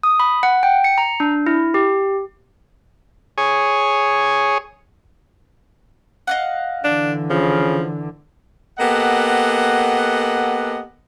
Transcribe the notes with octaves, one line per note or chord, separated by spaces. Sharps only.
D#6
B5
F#5
G5
C#7
A#5
D4
E4
G4
G#4 C#5
D#5 F5 F#5
D3 E3 D4
C#3 F3
A#3 B3 G4 A4 D#5 F#5